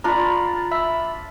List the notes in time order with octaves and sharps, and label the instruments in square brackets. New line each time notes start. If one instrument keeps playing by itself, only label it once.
[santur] D4 F4 [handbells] A#5 B5
[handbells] E5 B5 E6